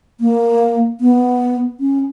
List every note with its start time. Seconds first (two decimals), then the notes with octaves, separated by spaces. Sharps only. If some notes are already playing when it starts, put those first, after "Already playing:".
0.20 A#3
1.01 B3
1.80 C#4